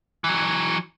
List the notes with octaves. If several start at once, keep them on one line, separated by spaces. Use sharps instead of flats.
E3 F#3